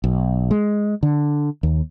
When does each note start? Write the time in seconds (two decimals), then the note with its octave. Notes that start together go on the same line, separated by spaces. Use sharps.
0.04 B1
0.51 G#3
1.03 D3
1.63 D#2